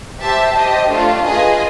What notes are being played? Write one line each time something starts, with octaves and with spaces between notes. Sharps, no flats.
G4 C5 E5 A5
G4 C5 D#5
A3 D4 F4
F4 G#4 B4 D#5 G#5